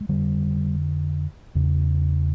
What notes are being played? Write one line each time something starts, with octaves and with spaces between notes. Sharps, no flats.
G#3
F2 D3 G3
E2 C#3